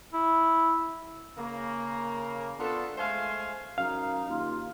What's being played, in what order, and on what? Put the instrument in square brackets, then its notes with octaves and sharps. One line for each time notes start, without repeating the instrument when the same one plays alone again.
[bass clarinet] E4
[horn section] C#3 A#3
B3 D4 F4 A4
G#3 A3 C5 F5 G#5
[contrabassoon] F#2 [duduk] D#4 [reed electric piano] F5
[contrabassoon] D#2 [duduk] F4